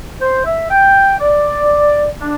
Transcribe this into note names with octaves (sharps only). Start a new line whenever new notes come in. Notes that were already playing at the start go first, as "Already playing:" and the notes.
C5
E5
G5
D5
D4